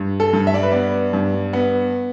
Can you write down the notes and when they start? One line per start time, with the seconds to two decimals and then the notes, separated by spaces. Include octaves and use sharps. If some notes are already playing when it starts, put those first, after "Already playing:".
Already playing: G2
0.20 A4
0.33 G2
0.47 E5
0.54 D5
0.63 B4
0.72 B3 D5
1.13 G2
1.53 B3